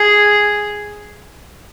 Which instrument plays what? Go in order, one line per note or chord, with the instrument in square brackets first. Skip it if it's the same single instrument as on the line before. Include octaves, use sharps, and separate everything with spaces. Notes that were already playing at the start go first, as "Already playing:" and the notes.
Already playing: [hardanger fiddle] G#4